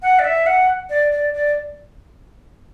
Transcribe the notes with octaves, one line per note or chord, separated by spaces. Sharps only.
F#5
D5
E5
F#5
D5
D5
D5